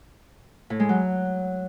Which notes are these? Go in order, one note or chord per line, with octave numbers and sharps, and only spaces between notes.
A2
G#3
F#3